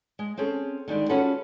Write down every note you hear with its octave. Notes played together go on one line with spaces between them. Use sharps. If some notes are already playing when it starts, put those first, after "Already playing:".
G#3
C4 C#4 G#4 A4
D3 D#3 G3 G#3
C#4 F4 F#4 G#4 A4 B4